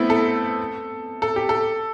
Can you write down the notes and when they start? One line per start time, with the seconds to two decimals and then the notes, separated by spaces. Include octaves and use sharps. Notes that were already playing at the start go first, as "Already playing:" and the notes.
Already playing: A3 B3 C4 E4
0.10 A4
1.22 A4
1.36 G4
1.49 A4